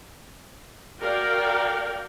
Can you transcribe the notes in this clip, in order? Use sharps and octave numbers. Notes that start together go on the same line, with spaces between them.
F#4 A#4 D5 F5 G5